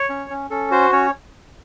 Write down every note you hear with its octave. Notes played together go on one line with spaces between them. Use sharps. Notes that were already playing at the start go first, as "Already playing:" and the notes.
Already playing: C#5
C#4
C#4
C#4 A4
F#4 C5
C#4 C#5